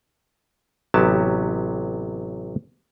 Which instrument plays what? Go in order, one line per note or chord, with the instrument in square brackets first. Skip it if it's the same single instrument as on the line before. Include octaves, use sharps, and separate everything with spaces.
[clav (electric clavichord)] A1 C3 F#3 B3 G4 A5